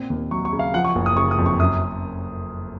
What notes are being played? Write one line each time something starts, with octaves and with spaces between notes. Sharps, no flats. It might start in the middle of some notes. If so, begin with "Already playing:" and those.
Already playing: A#2 C4
D#2
F#3 C#6
C#6
C#3
F5
F3 F#5
C#6
F#1
D#6
C#3 C#6
D#6
F2
C#6
F#2 D#6
F#2